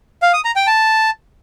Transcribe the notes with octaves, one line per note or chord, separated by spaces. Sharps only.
F5
D#6
A#5
G5
A5